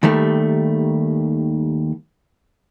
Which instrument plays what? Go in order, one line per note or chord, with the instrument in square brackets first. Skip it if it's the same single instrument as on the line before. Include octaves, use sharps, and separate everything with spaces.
[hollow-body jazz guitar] D#2 D#3 G3 A3